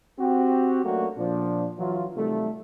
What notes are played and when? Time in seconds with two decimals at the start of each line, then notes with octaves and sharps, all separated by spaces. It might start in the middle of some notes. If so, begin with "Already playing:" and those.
0.18 C4 F#4 G4
0.84 F#3 A3 A#3 C#4 D4 F#4
1.17 A#2 F3 D4
1.78 E3 F#3 F4
2.15 C3 D#3 F#3 G3 A3